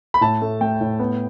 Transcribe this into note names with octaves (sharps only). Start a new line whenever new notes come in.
B5
A2 A5
A3
A3 G5
A2
B3